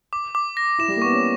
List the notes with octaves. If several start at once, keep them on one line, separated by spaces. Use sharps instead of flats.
D6
D6
A#6
E4 E7
G3
A#3
B3 C#6
C#4